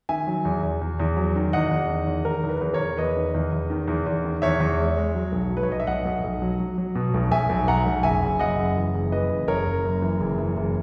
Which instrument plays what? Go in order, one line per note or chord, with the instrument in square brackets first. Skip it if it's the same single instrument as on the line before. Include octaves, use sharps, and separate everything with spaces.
[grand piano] D#3 E5 G#5
F#3
E2
E2
E2
E2
F#3
D#3
E2 D#5 F#5
E2
D#3
E2
D#3 A#4
E2
B4
E2
A#4 C#5
E2
E2 B4 D#5
D#3
E2
E2
D#3
E2
E2
D#3
E2 C#5 E5
E2
G#3
G#3
F#3
B1
F#3
B4
C#5
B1 D#5
E5
B1 D#5 F#5
B1
B1
F#3
F#3
F#3
B2
B1
B1 E5 G#5
B1
B1 F#5 A#5
B1
F#1 E5 G#5
F#1
F#2 D#5 F#5
F#1
E3
F#1
E3 B4 D#5
F#1
F#1 A#4 C#5
F#1
F#2
E3
F#1
E3
F#1